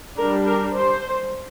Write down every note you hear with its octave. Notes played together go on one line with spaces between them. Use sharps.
G3 D4 A#4
A#4
C5